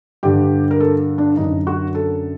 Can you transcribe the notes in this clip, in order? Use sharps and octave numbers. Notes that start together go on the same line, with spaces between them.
G2 D3 G4
A#4
A4
D4
F#2 D3 D#4
F#4
A4